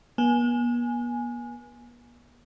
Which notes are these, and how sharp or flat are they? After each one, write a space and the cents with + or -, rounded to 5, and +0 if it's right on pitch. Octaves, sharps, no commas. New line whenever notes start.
B3 -45 G#5 +5